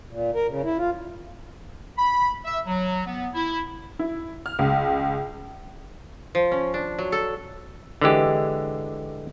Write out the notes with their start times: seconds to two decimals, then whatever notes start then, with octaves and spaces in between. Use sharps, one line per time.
0.11 A#2
0.35 A#4
0.48 C#3
0.64 E4
0.78 F4
1.98 B5
2.45 E5
2.67 F#3
3.06 B3
3.34 E4
3.99 E4
4.46 F6
4.59 C#2
6.35 F3
6.52 C#4
6.74 D4
6.99 F#3
7.12 A4
8.01 D3 E3 G#3 G4